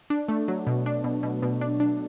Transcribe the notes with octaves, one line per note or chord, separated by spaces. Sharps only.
D4
A3
F#3
B2
D4
B2
B2
B2
D4
D4